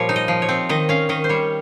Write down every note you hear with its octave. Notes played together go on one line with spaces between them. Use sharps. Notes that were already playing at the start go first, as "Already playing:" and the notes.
Already playing: A#2 F3 G3 C#5
D#4
D#5
F3
C#5
C4
D#3 D#5
C#4 F5
D#3 D#5
C5
G3 C#5